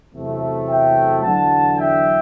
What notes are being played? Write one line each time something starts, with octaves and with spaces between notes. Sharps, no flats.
E2 C3 F#3 A3
E5 G5
E2 D3 F#3 F#5 A5
E5 G5